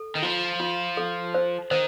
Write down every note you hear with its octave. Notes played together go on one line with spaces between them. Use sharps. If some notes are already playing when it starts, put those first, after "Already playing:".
Already playing: A4
D#3
F3 F4
F4
A4
C5
D#3 C5